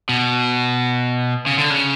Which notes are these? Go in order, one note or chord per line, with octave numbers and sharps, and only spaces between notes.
B2
C#3
D3
C#3